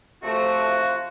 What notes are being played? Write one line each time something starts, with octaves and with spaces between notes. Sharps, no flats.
C3 F3 A3 F#4 C5
F4